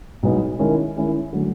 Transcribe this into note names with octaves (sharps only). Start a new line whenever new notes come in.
B1 B2 G#3 B3 D#4
D#3 G#3 C#4 E4
D#3 G#3 C#4 E4
D3 F#3 A3